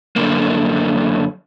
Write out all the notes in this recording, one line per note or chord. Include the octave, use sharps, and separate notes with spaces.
F#2 D3 A#3